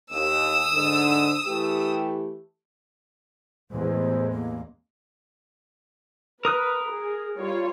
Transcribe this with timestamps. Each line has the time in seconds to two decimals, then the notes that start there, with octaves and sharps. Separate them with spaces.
0.11 D#2 D#6 E6
0.73 G#2 D3
1.46 E3 A3 G4
3.71 A1 E2 G#3 C5
4.31 A#3
6.45 A#4 B4 D#6 F#6
6.92 G#4
7.37 G3 F4 C#5